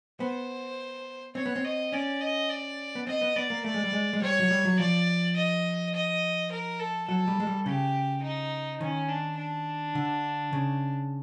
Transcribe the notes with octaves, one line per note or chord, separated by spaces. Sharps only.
B3 C5
C4 C#5
B3
C4
D#5
C#4 D5
D#5
D5
B3
C4 D#5
B3
B3 D5
A#3
A3 D5
G#3
G3
G#3
G#3
G3 C#5
F#3
G3
F#3
F3 D5
D#5
D#5
A#4
A4
F#3 A4
G3
G#3
G3
C#3 G4
D#4
D#3 C#4
D4
D4
D3
C#3